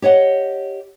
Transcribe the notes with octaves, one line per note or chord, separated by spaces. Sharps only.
G4 C#5 D#5 F#5